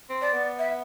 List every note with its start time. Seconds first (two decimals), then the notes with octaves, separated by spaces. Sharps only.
0.09 C4
0.21 D5
0.33 B3
0.59 E5